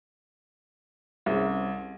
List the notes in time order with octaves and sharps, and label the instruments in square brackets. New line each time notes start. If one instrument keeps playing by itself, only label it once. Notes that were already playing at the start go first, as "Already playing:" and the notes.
[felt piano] C2 [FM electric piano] C4 C#4 G#4